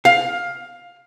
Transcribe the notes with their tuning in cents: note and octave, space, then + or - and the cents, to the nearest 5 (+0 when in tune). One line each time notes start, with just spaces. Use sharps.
F5 +15